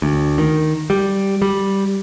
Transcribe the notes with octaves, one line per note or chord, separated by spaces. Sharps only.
D2
D#3
G3
G3